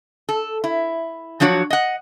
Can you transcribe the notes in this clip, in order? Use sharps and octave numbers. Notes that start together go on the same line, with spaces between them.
A4
E4
F3 F#3 D4 F#4 C#5
D#5 F#5